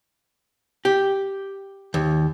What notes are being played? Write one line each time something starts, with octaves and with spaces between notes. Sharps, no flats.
G4
D#2